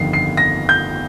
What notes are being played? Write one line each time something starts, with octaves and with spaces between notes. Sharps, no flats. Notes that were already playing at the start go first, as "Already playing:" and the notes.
Already playing: G1 F2 D#3 C7
C7
A#6
G6